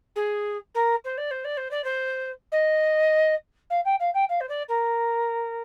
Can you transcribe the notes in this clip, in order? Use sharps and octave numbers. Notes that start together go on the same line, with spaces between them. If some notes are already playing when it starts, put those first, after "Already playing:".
G#4
A#4
C5
D5
C5
D5
C5
D5
C5
D#5
F5
G5
F5
G5
F5
C5
D5
A#4